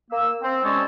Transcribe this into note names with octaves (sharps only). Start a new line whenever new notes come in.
A#3 E6
C4
G3 G#3 C#4 A4 C#5 D#5